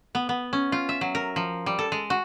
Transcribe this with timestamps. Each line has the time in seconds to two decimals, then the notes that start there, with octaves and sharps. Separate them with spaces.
0.15 B3
0.29 B3
0.53 C#4
0.72 F4
0.89 E5
1.01 F#3
1.15 A#4
1.36 F3
1.66 G3
1.79 A4
1.92 G#3
2.10 F#4